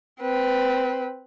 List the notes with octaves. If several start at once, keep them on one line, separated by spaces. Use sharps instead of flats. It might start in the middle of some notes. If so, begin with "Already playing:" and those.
C4 B4